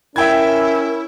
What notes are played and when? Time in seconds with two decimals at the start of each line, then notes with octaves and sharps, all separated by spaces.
0.16 C#4 E4 A#4 E5 G5 G#6